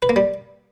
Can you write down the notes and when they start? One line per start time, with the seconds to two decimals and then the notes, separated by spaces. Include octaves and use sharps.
0.02 B4
0.09 A#3
0.16 G3